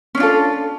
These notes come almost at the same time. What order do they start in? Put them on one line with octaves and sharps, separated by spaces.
C#4 D4 F4 A4